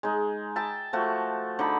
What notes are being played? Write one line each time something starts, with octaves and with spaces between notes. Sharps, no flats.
G#3 D#4
E5 G5 A5
F3 A3 F#4
D3 D#4 B5